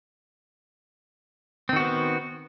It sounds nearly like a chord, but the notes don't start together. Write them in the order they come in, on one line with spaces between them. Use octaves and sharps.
C4 D#3 F#4 B3